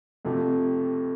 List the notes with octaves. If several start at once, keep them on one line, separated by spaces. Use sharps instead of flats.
F2 C3 F3 A3